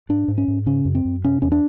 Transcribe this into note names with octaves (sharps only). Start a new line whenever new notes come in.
G#2 D4
G#2
C#4
G#2
C#3 C#4
F#2
C4
F#2
C3 C#4
E2 C#4
D4